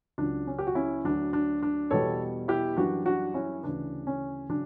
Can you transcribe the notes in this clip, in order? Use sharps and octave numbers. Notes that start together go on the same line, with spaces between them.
C#2 C#3 F#3 D4
C#4
G4
F#4
C#4 E4
D2 D3 F#3 D4
D4
D4
E2 B2 G3 A4 C#5
E4 G4
F#2 E3 G3 D4 F#4
D4 F#4
C#4 E4
D2 C#3 E3 D4
C#4
C#3 F#3 D4